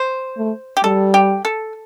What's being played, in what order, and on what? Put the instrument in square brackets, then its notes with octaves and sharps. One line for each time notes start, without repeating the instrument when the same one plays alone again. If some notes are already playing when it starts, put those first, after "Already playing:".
Already playing: [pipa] C5
[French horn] A3
[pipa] G4
[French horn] G3 [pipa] A4
[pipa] G4
A4